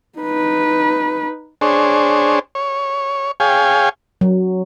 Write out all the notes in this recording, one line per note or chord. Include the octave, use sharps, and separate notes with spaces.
D#4 B4
D4 G#4 C5 C#5
C#5
G#4 C#5 F5 G5 G#5
F#3